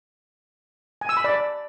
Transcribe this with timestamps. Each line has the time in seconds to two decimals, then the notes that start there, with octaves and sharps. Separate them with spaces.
1.01 G#5
1.09 E6
1.17 B5
1.24 D5